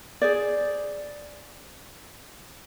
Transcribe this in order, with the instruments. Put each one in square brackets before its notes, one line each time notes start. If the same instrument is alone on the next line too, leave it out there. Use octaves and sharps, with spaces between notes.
[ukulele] G#4 C5 D5